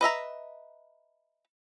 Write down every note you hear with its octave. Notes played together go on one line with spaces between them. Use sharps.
B4 D#5 E5 A#5